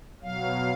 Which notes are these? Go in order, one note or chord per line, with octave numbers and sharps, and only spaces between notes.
B2 F#3 F5